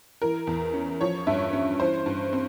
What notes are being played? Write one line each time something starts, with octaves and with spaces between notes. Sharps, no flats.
E3 A#4
E2
C#4
F3 C#5
G2 E5
C#4
E3 C5
G2
C4